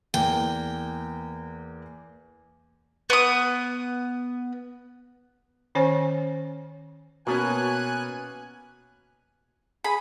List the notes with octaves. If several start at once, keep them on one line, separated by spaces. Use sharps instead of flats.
E2 A#3 G5
B3 D#6
D#3 C#4 C5 C#5 G#5
B2 A#3 B3 C#4 F#4 G#5 A#5 F#6
G#4 B5